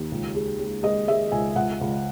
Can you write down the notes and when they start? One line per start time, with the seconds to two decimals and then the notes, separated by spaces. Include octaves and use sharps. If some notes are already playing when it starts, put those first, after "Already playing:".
Already playing: D#2
0.12 C#2
0.35 G#3
0.59 G#3
0.83 G#3 D#5
1.08 G#3 E5
1.32 C#2 G#5
1.56 C#2 F#5
1.81 C#2